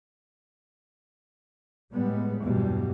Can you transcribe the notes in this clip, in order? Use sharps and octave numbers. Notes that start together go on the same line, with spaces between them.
A2 G3 G#3 B3
E2 G2 B2 E3 F#3 G3